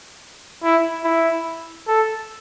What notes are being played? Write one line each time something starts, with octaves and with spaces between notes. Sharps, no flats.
E4
E4
A4